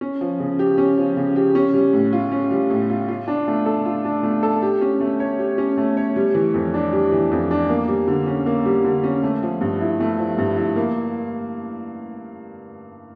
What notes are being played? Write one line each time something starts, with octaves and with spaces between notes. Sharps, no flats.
C#4
F3
C#3
G4
C#4
F3
C#3
G4
C#4
G3
A2
F4
C#4
G3
A2
F4
F4
D4
A3
A4
F4
D4
A3
A4
G4
C#4
A3
C#5
G4
C#4
A3
C#5
G3
E3
F2
D4
G3
E3
F2
D4
A#3
G3
D3
C#4
A#3
G3
D3
C#4
A3
F3
G2
E4
A3
F3
G2
E4
A#3